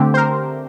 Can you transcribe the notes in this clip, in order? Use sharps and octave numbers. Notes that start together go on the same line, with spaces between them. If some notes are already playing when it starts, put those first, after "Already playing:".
Already playing: D3 A3 C4 G4
C5
A#4